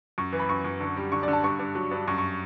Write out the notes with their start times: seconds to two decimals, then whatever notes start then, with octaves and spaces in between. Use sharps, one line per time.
0.18 F#2 C#6
0.33 E3
0.39 B5
0.49 F#2 C#6
0.64 F#2
0.80 D3
0.97 G3
1.12 D3 C#6
1.23 D3 D5
1.33 A5
1.43 G2 C#6
1.59 G2
1.75 F#3
1.91 G2
2.08 F#2 C#6
2.18 C#6